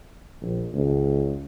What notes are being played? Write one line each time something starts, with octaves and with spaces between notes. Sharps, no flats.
A#1
C#2